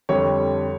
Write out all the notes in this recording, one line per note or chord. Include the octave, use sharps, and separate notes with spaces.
F2 D3 G3 C#5